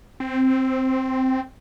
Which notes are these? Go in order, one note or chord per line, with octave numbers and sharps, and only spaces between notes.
C4